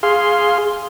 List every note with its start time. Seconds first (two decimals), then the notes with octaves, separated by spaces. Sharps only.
0.03 G#4 F5 C6